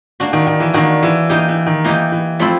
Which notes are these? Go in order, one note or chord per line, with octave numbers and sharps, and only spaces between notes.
A#3 D4 F#4
D#3
D#3
E3
D#3 A#3 D4 F#4
E3
E3 A#3 D#4 G4
E3
D#3
E3 A#3 D#4 G4
E3
F3 A3 C4 E4